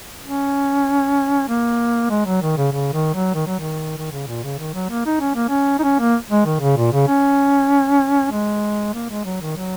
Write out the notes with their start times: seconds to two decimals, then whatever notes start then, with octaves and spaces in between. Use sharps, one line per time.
0.24 C#4
1.48 A#3
2.10 G#3
2.26 F#3
2.42 D#3
2.57 C#3
2.72 C#3
2.93 D#3
3.14 F#3
3.34 D#3
3.47 F#3
3.59 D#3
3.97 D#3
4.12 C#3
4.27 A#2
4.43 C#3
4.58 D#3
4.74 F#3
4.90 A#3
5.06 D#4
5.20 C#4
5.35 A#3
5.49 C#4
5.79 D#4
5.83 C#4
5.99 A#3
6.30 G#3
6.46 D#3
6.60 C#3
6.77 A#2
6.93 C#3
7.08 C#4
8.31 G#3
8.94 A#3
9.10 G#3
9.25 F#3
9.41 D#3
9.56 F#3